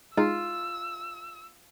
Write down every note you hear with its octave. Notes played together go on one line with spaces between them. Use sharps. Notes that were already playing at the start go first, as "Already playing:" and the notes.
G#3 D#4 F4 G#4 E6